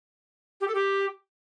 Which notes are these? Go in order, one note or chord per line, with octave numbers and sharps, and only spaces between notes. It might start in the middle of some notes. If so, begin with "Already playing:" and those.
G4
A4
G4